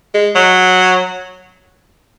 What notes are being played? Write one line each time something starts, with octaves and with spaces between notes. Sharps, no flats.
G#3
F#3